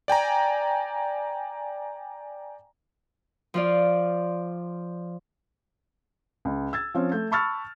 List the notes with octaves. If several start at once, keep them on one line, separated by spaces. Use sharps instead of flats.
D5 G5 G#5 A#5
F3 F4 D5
C#2
E6 G#6 A6
F3 C4 C#4
A3 G6
A5 B5 C#6 E6 F6 A6